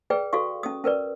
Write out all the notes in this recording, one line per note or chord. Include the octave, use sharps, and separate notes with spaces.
G#4 B4 D5 G5
F#4 A4 F5 C#6
C#4 D#6
C#4 A#4 B4 D5